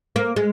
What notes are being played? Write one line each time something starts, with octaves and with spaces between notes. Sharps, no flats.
A#3
G#3